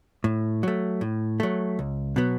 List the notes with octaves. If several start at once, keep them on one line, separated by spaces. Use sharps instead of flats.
A2
F#3 A3
A2
F#3 A3
C#2
B2 F#3 B3